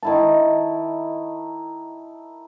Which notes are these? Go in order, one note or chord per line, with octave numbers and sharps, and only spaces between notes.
D#3 E4 A5